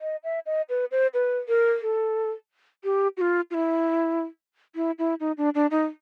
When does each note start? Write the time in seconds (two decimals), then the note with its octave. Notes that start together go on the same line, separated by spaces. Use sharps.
0.01 D#5
0.24 E5
0.46 D#5
0.69 B4
0.91 C5
1.14 B4
1.49 A#4
1.82 A4
2.84 G4
3.17 F#4
3.21 F4
3.51 F4
3.54 E4
4.76 E4
4.99 E4
5.20 D#4
5.38 D4
5.55 D4
5.71 D#4